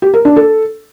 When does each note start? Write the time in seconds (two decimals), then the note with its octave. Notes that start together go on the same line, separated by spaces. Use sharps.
0.02 G4
0.14 A#4
0.25 D4
0.36 A4